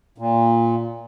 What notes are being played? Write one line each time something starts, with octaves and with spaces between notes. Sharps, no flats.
A#2